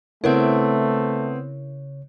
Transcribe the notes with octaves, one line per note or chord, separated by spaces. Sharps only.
C#3 A3 B3 C4 E4 A#4 C#5 E5